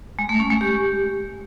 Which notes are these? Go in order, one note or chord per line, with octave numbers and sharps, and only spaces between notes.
G#3
A3
C#4
G#3
G4